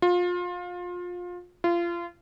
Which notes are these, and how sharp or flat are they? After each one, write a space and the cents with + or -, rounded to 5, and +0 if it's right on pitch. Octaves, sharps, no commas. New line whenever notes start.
F4 +25
F4 -25